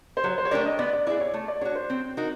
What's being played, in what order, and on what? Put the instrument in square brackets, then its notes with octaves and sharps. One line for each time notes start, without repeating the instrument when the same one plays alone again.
[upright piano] C5
[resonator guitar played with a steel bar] F#3 [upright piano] C#5
[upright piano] C5
C#5
[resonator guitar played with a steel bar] A3 D4 G4 A#4 [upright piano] D5
[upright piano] D#5
[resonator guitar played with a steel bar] B3 [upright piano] D5
[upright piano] D5
[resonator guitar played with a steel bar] E4 G#4 [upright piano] D5
[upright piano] C#5
[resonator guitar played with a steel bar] A3
[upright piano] D5
[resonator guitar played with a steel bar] D4 F#4 [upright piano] C#5
[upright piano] C5
[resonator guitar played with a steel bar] C4
D#4 F#4 A#4